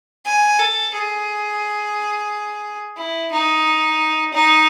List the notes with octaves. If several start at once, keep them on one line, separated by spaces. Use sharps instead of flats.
G#5
A4
G#4
E4
D#4
D#4